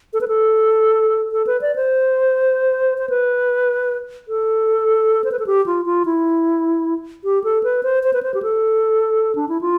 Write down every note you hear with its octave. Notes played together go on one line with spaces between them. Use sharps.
A4
B4
A4
A4
B4
D5
C5
C5
B4
A4
C5
B4
A4
G4
F4
F4
E4
G4
A4
B4
C5
C5
B4
C5
G4
A4
D4
E4
F4